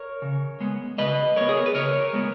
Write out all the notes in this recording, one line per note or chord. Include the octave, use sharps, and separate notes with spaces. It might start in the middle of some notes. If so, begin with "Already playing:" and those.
Already playing: A#4 C#5
C#3
G#3 B3
C#3 B4 D#5
G#3 B3 A#4 C#5
G#4
A#4
B4
C#3 A#4 C#5
G#3 B3